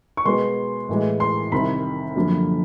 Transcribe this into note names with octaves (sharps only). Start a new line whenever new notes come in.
C#6
B2 G#3 B3 C6
A2 E3 G#3
C6
C2 C3 D#3 B5
F#2 D3 F3 A#3